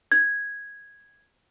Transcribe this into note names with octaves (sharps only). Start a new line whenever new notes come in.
G#6